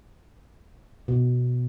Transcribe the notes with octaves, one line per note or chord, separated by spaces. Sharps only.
B2